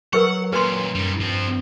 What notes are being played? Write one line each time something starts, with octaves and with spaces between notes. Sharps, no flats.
F#3 A#4 B4 F#5 C#6
F#2 A#2 B4 C6
F#2 G3 D#4
G2 F3 C4